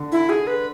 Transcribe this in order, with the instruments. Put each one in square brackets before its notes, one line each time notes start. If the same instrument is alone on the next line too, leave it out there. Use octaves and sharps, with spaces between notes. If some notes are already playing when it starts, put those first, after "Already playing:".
Already playing: [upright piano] D3
[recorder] E4
G#4
B4